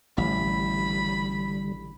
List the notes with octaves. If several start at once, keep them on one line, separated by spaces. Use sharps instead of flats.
A1 D3 G3 B5